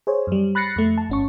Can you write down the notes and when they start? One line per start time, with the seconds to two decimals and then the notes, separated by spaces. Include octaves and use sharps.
0.07 G#4 C5 C#5
0.27 F#2 G3
0.55 B5 F#6 A6 A#6 C7 C#7
0.76 F2 A3
0.98 A5
1.09 G1 C#4 C#6